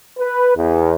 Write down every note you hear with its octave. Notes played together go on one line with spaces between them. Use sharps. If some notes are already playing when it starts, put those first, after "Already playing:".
B4
E2